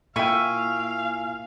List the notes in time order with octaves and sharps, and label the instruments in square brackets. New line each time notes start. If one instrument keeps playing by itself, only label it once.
[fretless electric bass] A#2 [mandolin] E4 G#5 C#6 [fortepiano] E5 G5 [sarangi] F5